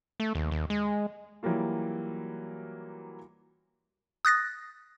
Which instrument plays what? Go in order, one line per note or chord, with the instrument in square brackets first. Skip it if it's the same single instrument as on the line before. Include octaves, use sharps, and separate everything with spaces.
[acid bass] A3
D#2
D#2
G#3
[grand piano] E3 F#3 G3 A#3 F4
[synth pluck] D#6 F#6 A6 A#6